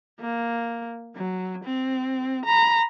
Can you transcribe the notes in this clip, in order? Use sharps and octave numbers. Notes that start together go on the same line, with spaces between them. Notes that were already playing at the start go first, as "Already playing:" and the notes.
A#3
F#3
C4
A#5 B5